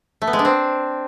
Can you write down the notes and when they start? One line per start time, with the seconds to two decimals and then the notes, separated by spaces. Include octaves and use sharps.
0.22 A3
0.27 B3
0.33 G#3
0.39 D4
0.45 C4